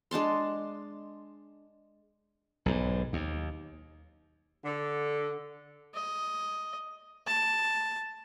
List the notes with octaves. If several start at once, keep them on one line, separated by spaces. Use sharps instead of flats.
G#3 D4 A5 C6
B1 G#2
D#2
D3
D#5
A5